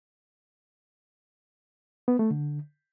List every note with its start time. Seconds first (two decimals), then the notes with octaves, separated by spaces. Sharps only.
2.08 B3
2.19 A3
2.31 D3